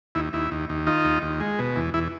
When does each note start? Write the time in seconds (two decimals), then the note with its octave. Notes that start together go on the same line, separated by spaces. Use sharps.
0.15 D#2 E4
0.33 D#2 E4
0.52 D#2
0.69 D#2
0.86 D#3 D#4 F4
1.05 D#2
1.22 D#2
1.40 G#3
1.59 B2
1.76 E2
1.94 E2 E4